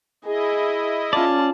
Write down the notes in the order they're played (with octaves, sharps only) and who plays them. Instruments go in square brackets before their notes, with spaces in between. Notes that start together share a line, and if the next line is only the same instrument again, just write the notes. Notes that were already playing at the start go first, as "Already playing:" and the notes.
[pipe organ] E4 D#5 [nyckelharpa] G#4
[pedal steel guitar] C#4 D5 [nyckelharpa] F4 A5